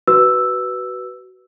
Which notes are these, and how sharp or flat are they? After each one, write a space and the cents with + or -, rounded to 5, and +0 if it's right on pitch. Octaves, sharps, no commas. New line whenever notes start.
F#4 +20 B4 +0 E6 +0